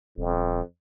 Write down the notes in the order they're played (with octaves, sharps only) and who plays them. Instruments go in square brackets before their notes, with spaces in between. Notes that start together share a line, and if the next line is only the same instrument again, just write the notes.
[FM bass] D#1 [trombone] F2